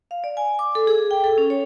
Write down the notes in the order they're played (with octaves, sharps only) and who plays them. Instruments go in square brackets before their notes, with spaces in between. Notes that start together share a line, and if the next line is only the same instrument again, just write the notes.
[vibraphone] F5
D5
G#5
D6
A4
G#4
G5
A4
C#4
C#5